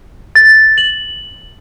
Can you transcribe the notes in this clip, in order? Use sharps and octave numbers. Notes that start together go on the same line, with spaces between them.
A6
F#7